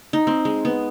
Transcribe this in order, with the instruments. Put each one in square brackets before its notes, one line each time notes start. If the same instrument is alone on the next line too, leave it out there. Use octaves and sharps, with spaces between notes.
[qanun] D#4
C4
G#3
B3